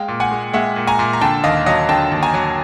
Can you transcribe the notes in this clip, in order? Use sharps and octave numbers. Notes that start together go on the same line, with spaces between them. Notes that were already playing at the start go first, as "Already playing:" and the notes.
Already playing: G#3 F5 G5
A#2
F#5 G#5
G#3
G#3 E5 F#5
A#2
G#5 A#5
A#2
A#5
D3 G5 A5
D#2 D#5 F5
F#3 D#5 F5
D3 G5 A5
D#2
G#5 A#5
F#3